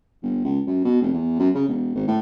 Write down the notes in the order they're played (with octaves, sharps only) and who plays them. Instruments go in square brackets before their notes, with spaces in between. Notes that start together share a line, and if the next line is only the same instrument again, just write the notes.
[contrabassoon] G1
C#2
F#2
B2
F1
E2
F#2
C#3
E1
G#1
A2